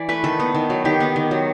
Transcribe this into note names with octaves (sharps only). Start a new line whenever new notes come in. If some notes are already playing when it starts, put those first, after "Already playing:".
Already playing: E3 D5
A3 B4
D#3 A4
B3
D#3
F#3
D#3 G4
B3
D#3
F#3